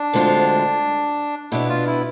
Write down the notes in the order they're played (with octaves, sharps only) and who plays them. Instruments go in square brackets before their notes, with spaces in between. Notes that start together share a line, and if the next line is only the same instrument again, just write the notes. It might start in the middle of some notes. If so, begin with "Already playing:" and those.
Already playing: [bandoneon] D4
[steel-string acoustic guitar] D2 D3 G#3 C4 F4
[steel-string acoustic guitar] B2 B3 D4 [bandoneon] E4
[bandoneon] F4
E4